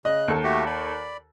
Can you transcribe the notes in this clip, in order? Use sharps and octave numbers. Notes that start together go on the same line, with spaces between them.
C#3 D#5 F#6
D#2 A4
A3 F#4 G4
D5 B5